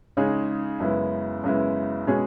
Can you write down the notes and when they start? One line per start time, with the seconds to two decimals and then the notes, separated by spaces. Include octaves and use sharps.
0.17 C#3 G#3 D#4 G#4 C#5
0.80 F#2 C#3 G#3 B3 E4
1.44 F#2 C#3 G#3 B3 E4
2.07 B2 G#3 C#4 G#4 C#5